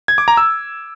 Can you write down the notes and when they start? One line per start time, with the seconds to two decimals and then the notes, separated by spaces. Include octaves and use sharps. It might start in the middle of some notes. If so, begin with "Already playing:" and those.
0.08 G#6
0.18 D6
0.28 A#5
0.37 E6